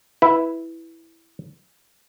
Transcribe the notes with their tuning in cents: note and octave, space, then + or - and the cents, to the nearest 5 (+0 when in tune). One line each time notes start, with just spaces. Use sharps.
E4 +0 B4 +0